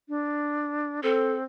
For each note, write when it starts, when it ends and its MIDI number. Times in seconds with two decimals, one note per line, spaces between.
0.09 1.00 62
1.03 1.44 60
1.03 1.34 69